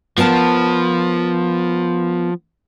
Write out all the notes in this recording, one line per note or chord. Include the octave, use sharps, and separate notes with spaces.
F3 B3 A#4 A5